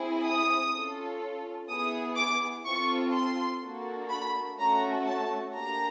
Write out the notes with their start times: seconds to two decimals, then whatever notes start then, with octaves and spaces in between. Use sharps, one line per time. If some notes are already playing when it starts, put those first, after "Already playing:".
Already playing: C4 E4 G#4
0.25 D#6
0.73 C#4 F4 A4
1.69 B3 E4 G#4 D#6
2.17 D6
2.66 C4 F4 A4 C#6
3.14 C6
3.62 A#3 D4 F#4 A4
4.10 B5
4.59 A3 C#4 F#4 A#5
5.07 A5
5.55 A#3 D4 G4 A#5